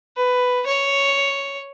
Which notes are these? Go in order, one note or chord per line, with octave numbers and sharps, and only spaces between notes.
B4
C#5